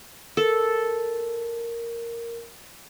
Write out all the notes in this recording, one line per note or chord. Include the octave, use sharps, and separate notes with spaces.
A4 A#4